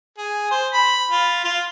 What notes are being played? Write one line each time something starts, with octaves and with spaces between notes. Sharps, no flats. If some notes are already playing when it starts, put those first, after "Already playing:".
G#4
C5
B5
F4
F4